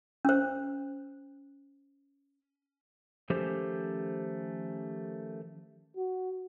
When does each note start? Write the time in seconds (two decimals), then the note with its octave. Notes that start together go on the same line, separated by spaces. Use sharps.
0.25 C#4 C5
3.30 D#3 F3 A3 C#4 G4 C5
5.97 F#4